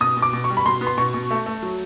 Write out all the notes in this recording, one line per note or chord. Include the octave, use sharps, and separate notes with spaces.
B2 D#6
B2
D6
B2
C#6
G3
B5
B2 C6
B3
C6
B2 C#6
B2
A3
A3
F#3